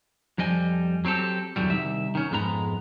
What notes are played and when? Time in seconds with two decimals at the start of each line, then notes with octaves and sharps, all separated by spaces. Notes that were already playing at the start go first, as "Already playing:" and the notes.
0.38 F2 F3 G3 D#5 G#5
1.05 F#3 C4 G4 A4
1.56 E2 A2 D3 F#3 G3
1.70 C2 D#3 E5
2.15 D#3 C#4
2.31 F2 G#2 G#3 B3 A#5